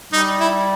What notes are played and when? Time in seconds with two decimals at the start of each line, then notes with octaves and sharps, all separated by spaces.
0.12 G3 D#4
0.40 E4